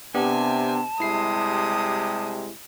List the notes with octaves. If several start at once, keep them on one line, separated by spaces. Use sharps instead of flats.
C3 B3 D4 G4 G#5 A5
C3 G3 G#3 E4 D#6 C7